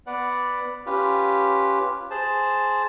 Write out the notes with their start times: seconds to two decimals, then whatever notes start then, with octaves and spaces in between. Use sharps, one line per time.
0.07 B3 B4 D5 F#5
0.86 C#4 F4 G4 B4
2.11 G#4 C5 A5